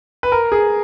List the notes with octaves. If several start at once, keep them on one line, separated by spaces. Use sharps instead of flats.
B4
A#4
G#4